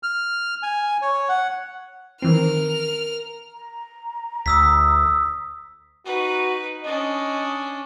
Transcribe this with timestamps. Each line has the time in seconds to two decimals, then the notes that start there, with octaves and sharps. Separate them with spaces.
0.03 F6
0.63 G#5
1.02 C#5
1.29 F#5
2.22 D#3 E3 C4 A#4 F6
3.52 A#5
4.46 D2 D#6 E6 B6
6.05 D#4 F#4 B4
6.84 C#4 D4 D#5